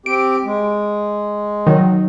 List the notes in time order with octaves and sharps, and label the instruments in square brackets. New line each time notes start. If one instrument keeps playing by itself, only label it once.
[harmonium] C4 G4 [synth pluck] D7
[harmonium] G#3
[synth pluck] D#3 F#3